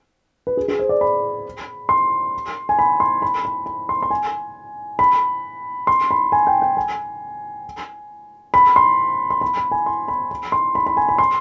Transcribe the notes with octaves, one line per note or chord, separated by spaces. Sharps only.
B4
G#4
G#4
C5
D5
B5
C6
G#5
B5
C6
B5
B5
B5
C6
C6
G#5
B5
C6
B5
G#5
G5
G5
G#5
B5
C6
C6
B5
B5
G#5
C6
B5
B5
C6
B5
B5
G#5
B5
C6